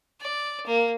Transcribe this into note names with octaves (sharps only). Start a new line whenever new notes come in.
D5
A#3